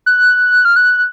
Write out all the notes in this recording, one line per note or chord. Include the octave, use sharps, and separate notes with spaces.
F#6
F6
F#6